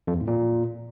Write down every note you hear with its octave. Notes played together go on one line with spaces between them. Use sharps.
F2
E2
A2
A#2